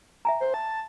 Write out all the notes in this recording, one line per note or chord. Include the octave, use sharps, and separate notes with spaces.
E5 G#5 A#5
C5
A5